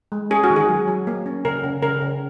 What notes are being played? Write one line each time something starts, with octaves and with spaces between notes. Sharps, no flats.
G#3
C#4 G#4
F#4
D#3
G#4
F#3
F#3
A#3
C#4
C#3 A#4
C#3
C#3 A#4
C#3